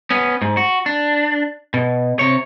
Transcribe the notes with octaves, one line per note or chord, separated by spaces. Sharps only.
B3 C#4
G#2
F#4
D4
B2
C3 C#5